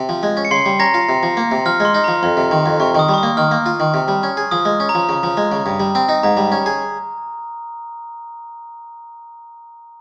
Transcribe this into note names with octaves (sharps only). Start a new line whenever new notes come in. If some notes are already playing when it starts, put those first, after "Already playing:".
Already playing: C3
F3
G#3
C#4
C#7
C#3 C6 C7
G3
C#4 A#5 A#6
F4
C3
F3
A#3
C3
F3 F6
G#3 C6
D#4
F3 A#5
F2 C6
C3
D#3
F2
C3 C#6
D#3 D#6
G3
C#6
D#6
A#3
D#3 F6
A#3
F4
D#3
C3
G3
C#4
G#4
F3 D#6
G#3
C#4
A#5
F3
C#3
F3
G#3
C#3
G2
G3
C4
D#4
G#2 A#5
G3
C#4
G#4